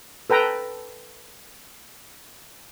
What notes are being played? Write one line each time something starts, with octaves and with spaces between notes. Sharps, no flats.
A4 B4 G5 A#5